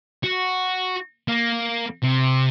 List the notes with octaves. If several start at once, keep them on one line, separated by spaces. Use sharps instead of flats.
F#4
A#3
C3